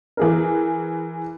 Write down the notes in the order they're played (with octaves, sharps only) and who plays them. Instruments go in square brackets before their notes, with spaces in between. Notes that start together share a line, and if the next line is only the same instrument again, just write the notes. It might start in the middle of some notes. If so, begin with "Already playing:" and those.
[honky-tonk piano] E3 G#4 A#4